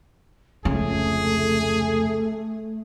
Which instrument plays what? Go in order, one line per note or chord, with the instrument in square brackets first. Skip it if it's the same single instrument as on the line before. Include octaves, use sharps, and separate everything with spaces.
[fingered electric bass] F1 C#2 [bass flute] A3 [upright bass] C#4 [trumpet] G#4